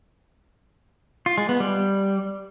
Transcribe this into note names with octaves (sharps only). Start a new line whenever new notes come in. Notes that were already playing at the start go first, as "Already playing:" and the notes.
F4
G#3
B3
G3